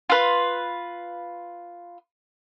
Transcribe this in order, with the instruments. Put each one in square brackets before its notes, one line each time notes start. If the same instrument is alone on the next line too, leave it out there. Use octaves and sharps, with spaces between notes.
[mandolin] F4 B4